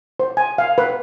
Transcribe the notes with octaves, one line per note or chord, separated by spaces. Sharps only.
C5
G#5
F5
B4